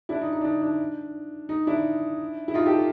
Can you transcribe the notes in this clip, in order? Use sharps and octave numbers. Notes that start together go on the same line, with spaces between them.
D4 E4
D#4
D#4
D4
D#4
D4
D#4
D4 E4
E4
D#4 F4
G4 A4